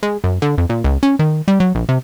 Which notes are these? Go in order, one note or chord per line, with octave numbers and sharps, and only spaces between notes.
G#3
F#2
D3
F2
A#2
C#2
C#4
D#3
G3
F#3
A#1
C3